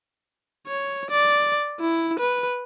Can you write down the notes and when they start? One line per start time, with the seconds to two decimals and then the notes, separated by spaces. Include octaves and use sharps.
0.67 C#5
1.10 D5
1.80 E4
2.19 B4